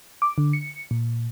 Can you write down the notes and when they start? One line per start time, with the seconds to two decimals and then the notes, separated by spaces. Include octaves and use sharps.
0.22 D6
0.38 D3
0.53 C#7
0.91 A#2